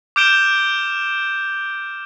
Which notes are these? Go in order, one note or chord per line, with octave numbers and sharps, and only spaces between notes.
D6 F6 G6 D7 E7 G7